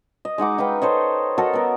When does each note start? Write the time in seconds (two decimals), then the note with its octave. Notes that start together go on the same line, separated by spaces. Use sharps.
0.25 D#5
0.38 G#3 D#4 F#5 D6
0.58 D#4 B4 F5 G5
0.82 A4 C5 C#5 D#5
1.38 F#4 A4 A#4 D#5
1.53 B3 A#4